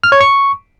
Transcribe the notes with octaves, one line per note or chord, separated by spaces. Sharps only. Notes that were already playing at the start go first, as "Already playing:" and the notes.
F6
C#5
C#6